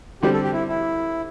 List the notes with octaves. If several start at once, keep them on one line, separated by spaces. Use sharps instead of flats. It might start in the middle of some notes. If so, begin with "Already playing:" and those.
D3 G3 C4 G4
A4
G4
E4
E4